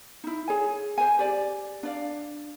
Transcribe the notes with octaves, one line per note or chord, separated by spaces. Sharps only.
D#4 E4
G#4 C#5 G#5
C5 G#5
G4 D5
D4 D5 F5